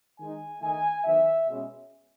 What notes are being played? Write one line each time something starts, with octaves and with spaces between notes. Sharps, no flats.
D#3 G#3 D#4 G#5
D#3 A3 D#4 G#5
D#3 F#3 B3 E5
B2 G#3 C#4